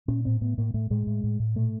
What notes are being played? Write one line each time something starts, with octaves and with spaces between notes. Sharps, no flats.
A#2 C#4
A2 C4
A2 B3
A2 A#3
A2 A3
A2 G#3
A2
A2
A2
A#2 A3